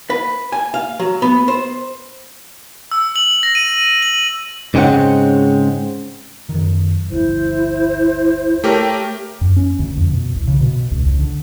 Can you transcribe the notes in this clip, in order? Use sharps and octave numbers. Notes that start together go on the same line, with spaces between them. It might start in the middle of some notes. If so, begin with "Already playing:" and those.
B4
G#5
F5
F#3
B3
C5
E6
F#7
A#6
D#7
F#7
G#2 C#3 G#3 C4 C#4 F#5
F#2 D#3
G1 D2 E4 C5
A3 G4 A#4 C#5
F#2
C#4
D2
F2
B2
C2
C#3
B2
C#2
C#2
D3